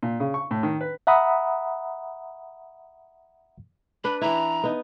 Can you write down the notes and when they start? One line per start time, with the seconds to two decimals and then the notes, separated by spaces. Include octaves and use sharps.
0.03 A#2
0.20 C#3
0.34 C#6
0.51 A2
0.63 D#3
0.81 B4
1.07 E5 F#5 A#5 B5 D#6
4.04 D4 B4 B5
4.21 E3 E4 A#5
4.64 B3 D#4